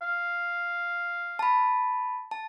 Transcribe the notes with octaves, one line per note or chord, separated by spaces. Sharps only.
F5
A5 B5
A5